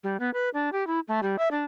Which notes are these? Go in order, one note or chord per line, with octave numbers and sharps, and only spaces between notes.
G3
B3
B4
D4
G4
E4
A3
G3
E5
D4